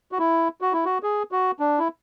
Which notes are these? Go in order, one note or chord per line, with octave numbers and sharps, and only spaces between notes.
F#4
E4
F#4
E4
F#4
G#4
F#4
D4
E4